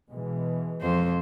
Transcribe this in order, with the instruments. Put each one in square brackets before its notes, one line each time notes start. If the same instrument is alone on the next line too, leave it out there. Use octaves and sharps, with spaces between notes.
[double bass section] B2 E3 G#3
[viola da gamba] F2 C5